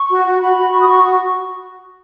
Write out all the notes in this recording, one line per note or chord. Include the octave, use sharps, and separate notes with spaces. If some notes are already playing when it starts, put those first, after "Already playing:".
Already playing: C#6
F#4
F#4
F#4 B5
F#4
F#4 C#6
D#6
F#4 C#6
F#4